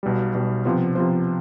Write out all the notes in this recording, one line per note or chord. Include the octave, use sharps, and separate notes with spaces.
B1 B2 G3
B1 B2 G3
C3 F3 B3 F4 C5
C3 F3 B3 F4 C5